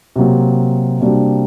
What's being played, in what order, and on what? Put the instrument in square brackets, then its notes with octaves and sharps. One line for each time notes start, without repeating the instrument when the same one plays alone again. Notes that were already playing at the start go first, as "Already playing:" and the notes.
[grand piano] C3 F#3 A#3
C3 G3 A#3 D4 F#4